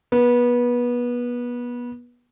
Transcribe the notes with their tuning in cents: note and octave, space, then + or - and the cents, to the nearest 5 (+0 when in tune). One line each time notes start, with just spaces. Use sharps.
B3 -25